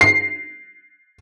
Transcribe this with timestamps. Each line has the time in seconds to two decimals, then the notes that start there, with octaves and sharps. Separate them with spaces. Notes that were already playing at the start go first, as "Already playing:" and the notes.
0.01 C7